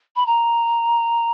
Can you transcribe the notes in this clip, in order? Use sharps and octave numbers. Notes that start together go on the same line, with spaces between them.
B5
A#5